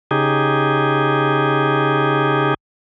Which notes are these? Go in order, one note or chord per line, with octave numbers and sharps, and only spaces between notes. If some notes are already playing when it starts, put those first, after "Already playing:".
C#3 D#4 G4 G#4